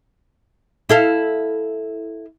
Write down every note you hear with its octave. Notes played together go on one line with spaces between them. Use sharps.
E4 A4 F5